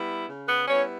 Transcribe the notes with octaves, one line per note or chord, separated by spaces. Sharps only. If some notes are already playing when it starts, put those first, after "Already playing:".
Already playing: G3 B3 E4
C#3
B3 B4
G3 B3 C#4 E4 C#5